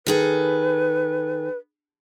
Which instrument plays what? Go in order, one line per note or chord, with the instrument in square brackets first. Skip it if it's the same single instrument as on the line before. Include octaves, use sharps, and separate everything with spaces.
[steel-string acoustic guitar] D#3 G#4 A4 [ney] B4